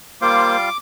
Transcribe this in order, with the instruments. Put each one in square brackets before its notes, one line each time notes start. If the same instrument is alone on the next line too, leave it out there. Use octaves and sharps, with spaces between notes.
[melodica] G3 F4 C6 [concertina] A#3 C5 [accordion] D6